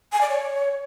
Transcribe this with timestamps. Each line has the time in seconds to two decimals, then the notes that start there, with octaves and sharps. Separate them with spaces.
0.12 G#5
0.21 D5
0.29 C#5